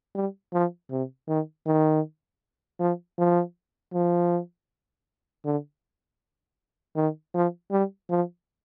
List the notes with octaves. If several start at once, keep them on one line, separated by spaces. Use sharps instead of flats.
G3
F3
C3
D#3
D#3
F3
F3
F3
D3
D#3
F3
G3
F3